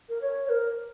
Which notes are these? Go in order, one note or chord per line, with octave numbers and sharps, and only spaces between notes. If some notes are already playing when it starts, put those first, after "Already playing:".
A#4
C#5
C#5
A#4